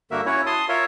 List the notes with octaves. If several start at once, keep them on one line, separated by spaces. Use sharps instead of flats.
G2 D3 A#3 F#4 A#4 E5
C#4 E4 F#4 C#5
A5 C6 D#6
F4 A#4 C#5 E5